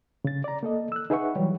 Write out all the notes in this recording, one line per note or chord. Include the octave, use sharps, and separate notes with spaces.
C#3 A6
D5 A#5
A#3 A4 D#5
E6 F#6
D#4 G#4 B4 E5 F#5 C#6
E3 F#3 G3 G4 C#5